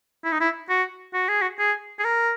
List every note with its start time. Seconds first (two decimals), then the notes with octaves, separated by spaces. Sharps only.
0.24 E4
0.32 D#4
0.40 E4
0.69 F#4
1.14 F#4
1.28 G#4
1.42 F#4
1.59 G#4
1.99 G#4
2.04 A#4